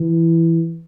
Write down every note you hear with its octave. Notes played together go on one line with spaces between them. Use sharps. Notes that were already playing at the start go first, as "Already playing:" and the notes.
Already playing: E3